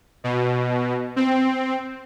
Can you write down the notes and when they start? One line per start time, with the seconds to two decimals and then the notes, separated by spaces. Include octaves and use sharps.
0.24 B2
1.16 C4